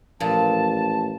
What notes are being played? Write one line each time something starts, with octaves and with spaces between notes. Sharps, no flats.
A1 A#2 F3 F4 A5